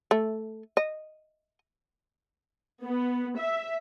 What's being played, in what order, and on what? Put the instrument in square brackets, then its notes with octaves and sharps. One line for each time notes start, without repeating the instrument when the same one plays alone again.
[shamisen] A3
D#5
[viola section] B3
E5